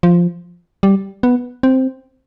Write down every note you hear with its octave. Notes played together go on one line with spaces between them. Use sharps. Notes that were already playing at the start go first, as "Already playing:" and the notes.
F3
G3
B3
C4